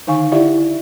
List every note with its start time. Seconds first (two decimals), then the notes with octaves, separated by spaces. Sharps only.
0.07 D3 D#3 D#4 F5 G#5 C#6
0.32 E4 G4 D5 E5 F#5